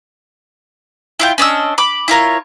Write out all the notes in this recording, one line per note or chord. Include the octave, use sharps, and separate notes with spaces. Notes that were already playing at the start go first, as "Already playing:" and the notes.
E4 F4 G5
C#4 D4 D#5 E6
B5 D6
E4 F4 A#4 C#5